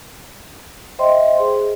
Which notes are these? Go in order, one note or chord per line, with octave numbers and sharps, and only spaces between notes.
C5 D#5 E5 G5 C6
G#4